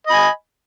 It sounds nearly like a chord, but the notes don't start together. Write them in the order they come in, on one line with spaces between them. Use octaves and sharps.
D#5 B5 G#5